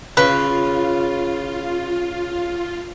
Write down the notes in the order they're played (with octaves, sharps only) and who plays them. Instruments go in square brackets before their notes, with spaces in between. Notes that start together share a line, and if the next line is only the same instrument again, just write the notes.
[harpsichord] C#3 [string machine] F4 [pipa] B4